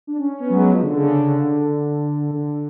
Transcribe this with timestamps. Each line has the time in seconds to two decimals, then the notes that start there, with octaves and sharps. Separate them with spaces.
0.07 D4
0.18 C#4
0.29 C#4
0.39 B3
0.50 F#3
0.55 G#3
0.71 F3
0.82 D3
0.92 C#3
1.03 D3
2.31 D3
2.47 D3